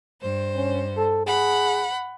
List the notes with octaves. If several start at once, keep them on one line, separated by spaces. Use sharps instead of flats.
G2 C5
C#4
A4
G#4 F#5 B5